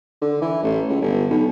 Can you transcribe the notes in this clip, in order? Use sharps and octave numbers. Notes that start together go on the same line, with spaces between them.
D3
E3
A1
C#2
G1
B1